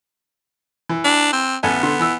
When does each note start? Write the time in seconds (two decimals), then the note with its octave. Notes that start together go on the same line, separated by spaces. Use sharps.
0.89 E3
1.05 D4
1.33 C4
1.63 A1 B3 A4 G#5
1.83 D3 C6
2.00 E3 E6